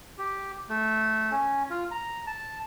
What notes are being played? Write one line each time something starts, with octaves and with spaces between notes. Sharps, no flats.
G4
A3
C#4
F4
A#5
A5